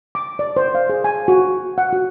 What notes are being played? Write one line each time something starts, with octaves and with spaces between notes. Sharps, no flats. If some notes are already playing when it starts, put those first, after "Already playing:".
D6
D5
C5
F5
G#4
G#5
F#4
F#5
F#4